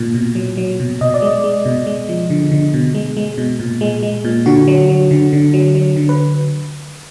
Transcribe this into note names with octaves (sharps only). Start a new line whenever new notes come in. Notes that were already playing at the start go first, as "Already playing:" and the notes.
Already playing: A#2
B2
F#3
F#3
B2
B2 D#5
D5
G#3
D#5
G#3
B2
G#3
F3
D3
D3
B2
G#3
G#3
B2
A#2
G#3
G#3
A#2
D3 F#4
F#3
F#3
D3
D3
F#3
F#3
D3
B4